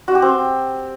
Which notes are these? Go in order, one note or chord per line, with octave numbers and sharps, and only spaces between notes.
F#4
G4
C4